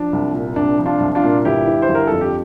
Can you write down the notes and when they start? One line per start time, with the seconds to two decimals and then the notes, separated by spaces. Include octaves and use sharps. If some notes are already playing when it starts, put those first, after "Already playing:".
Already playing: F3 D4
0.13 C2
0.34 A#2
0.56 C2 D4
0.79 F3
0.86 D4 F4
1.00 C2
1.15 D4 F4
1.23 A#2
1.45 G1 E4 G4
1.67 E3
1.82 C5
1.89 G1
1.95 A#4
2.07 F2 A4
2.21 G4